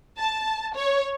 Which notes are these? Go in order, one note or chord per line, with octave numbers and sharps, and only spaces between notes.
A5
C#5